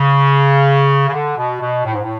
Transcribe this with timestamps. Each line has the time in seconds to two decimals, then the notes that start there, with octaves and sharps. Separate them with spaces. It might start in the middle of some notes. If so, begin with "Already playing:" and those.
Already playing: C#3
1.09 C#3
1.13 D3
1.37 B2
1.61 B2
1.85 A2
1.94 G#2
2.02 A2